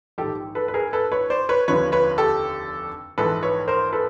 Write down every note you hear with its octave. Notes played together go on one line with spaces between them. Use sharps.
A#1 G#2 D#3 G4 A4
A4 B4
B4
G#4 A#4
A4 B4
B4 C#5
C5 D5
B4 C#5
F1 D#2 D3 F3 B4 C#5
B4 C#5
G4 A4
A#1 G#2 E3 A4 B4
B4 C#5
A#4 C5
A4 B4